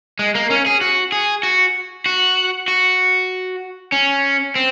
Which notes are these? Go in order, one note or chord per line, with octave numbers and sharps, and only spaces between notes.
G#3
A#3
C#4
G#4
F#4
G#4
F#4
F#4
F#4
C#4
C4